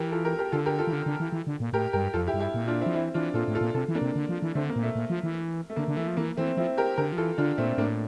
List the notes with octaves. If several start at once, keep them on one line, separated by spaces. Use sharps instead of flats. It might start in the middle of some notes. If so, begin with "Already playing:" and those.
Already playing: E3 G4 A#4
F4 A4
G4 A#4
G4 A#4
D3 F4 A4
G4 A#4
F4 A4
E3
D3
D3
E3
E3
D3
A#2
A2 G4 A#4
G2 G4 A#4
F2 F4 A4
E4 G4
G2
E4 G4
A#2
D4 F4
C4 E4
F3
E3 C4 E4
E3 D4 F4
A#2 F4 A4
A2
F4 A4
A#2
C3 F4 A4
E3
A#3 D4
C3
D3
F3
E3
D3 A3 C4
A#3
A#2
A3
A#2
F3
E3
A3
D3 A#3
D3
E3 A3
F3
E3 A#3
E3 A3 C4
F3 C4 E4
G4 A#4
D3 G4 A#4
F3
E3 F4 A4
D3 D4 F4
A#2 A3 C4
A2 A#3 D4